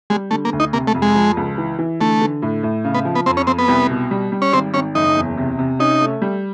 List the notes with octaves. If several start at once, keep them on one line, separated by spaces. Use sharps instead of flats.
G3 G#3
D3 A3
A#3
D2
D#4
C3 A#3
A3
F2
G#3
F3
C#2
E3
E3
D3 A3
D3
A2
A2
C#3
B3
F3
B3
F2 C4
C#4
F2 C4
B3
C2
B2
G3
G3
C#4
G#1 C4
G#1 C#4
F#1 D#4
E2
C3
C3
C#4 D#4
A3
G3